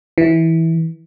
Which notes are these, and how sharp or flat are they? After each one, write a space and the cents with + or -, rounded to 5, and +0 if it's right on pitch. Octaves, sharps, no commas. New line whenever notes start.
E3 -15